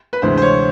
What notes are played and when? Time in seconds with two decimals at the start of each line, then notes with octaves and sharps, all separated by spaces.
0.13 B4
0.22 D2 C3 E3 G#3 C5
0.37 C5
0.42 C#5